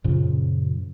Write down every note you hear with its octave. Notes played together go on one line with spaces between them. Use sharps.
F#2 A#2 C#3 F3